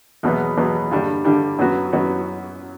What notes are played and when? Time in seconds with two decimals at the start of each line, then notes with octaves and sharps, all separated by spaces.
0.23 E2 B2 F#3 B3
0.57 E2 B2 F#3 B3
0.91 G2 D3 G3 D4
1.24 G2 D3 G3 D4
1.59 F#2 F#3 B3 F#4
1.93 F#2 F#3 B3 F#4